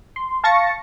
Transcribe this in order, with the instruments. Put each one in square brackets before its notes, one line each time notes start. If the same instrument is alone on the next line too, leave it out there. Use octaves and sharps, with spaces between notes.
[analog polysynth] C6
F5 A5 C#6 A6 A#6 C#7